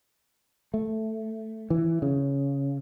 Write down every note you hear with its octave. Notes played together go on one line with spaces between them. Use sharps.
A3
E3
C#3